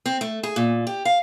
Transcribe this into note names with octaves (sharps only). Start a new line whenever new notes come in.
C4
A3
G#4
A#2
G4
F5